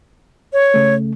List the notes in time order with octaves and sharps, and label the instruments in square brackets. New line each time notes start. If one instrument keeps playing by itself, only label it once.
[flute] C#5
[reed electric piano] C#2 C#3 A3